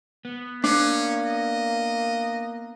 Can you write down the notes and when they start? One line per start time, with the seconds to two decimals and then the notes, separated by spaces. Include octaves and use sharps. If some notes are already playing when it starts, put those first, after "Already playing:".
0.25 B3
0.64 A#3 C#4 D4
1.26 D#5